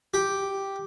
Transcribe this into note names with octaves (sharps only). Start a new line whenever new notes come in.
G4